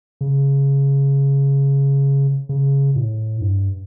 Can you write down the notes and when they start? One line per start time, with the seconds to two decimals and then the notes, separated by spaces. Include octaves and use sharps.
0.21 C#3
2.49 C#3
2.96 A2
3.41 G2